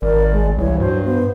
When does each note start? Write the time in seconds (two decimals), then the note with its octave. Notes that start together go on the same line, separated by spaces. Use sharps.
0.02 G#1 A#4 D5
0.32 G#3
0.58 C2 E3 C#5
0.80 G2 F#3 C5
1.05 B3 C5